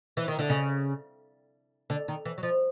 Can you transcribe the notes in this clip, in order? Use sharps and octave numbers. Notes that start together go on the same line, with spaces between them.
E3
D#3
D3
C#3
D3
D#3
E3
F#3
F3